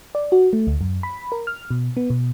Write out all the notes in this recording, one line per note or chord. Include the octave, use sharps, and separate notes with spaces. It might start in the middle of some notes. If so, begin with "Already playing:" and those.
D5
F#4
A3
D2
F#2
B5
A#4
F6
B2
B3
B2